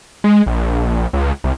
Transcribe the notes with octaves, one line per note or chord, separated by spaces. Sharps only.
G#3
A#1
C#2
C2